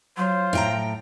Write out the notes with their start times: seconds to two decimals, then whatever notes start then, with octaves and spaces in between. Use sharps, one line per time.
0.17 F#3 F4 C5
0.53 A2 G5 A#5